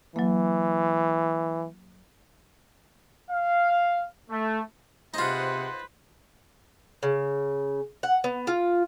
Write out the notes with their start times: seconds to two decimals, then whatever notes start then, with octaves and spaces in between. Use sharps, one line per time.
0.16 E3 F#3 A#3
3.30 F5
4.30 A3
5.14 C3 D#4 F4 G#4 B4 C5 F#5
7.03 C#3
8.03 F#5
8.24 B3
8.47 F4